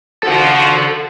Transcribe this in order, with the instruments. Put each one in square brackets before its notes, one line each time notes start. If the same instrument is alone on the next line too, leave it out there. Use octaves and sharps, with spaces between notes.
[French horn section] F3 F#4 [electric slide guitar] A4 F#5